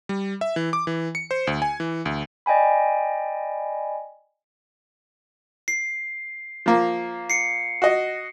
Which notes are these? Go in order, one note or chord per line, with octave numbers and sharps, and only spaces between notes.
G3
E5
E3
D6
E3
C#7
C5
D2
G#5
E3
D2
D5 D#5 G5 G#5 B5
C7
F3 A#3
C7 C#7
F#4 D#5